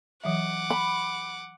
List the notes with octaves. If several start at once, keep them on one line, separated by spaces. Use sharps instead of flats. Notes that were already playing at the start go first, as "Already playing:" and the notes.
E3 F#3 E5 F#5 D6
B5